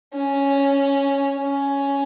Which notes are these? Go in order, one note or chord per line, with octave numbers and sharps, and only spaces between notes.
C#4
C#4